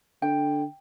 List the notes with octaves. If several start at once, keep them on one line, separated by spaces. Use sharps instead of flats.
D3 G5